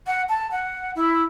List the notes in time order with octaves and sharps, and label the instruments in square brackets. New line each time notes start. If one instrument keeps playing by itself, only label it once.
[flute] F#5
A5
F#5
E4